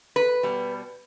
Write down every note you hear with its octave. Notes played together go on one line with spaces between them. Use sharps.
B4
B2 G3